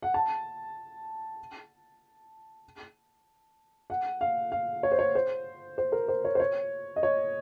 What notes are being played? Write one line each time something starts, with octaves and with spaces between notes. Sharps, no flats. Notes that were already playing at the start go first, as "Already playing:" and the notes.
F#5
A5
F#5
F5
F5
C#5
C5
C#5
C5
C5
A#4
C5
C#5
C5
C#5
D#5
C#5